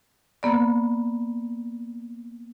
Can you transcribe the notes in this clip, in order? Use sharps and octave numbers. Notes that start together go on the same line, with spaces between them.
A#3 B3 D5